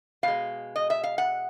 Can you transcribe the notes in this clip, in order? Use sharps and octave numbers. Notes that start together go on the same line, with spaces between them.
B2 G#3 F5
D#5
E5
F5
F#5